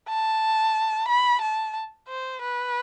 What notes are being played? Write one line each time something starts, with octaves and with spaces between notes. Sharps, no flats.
A5
B5
A5
C5
B4